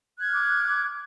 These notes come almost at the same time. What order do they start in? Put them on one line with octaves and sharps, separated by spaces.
F#6 G#6 F6 D6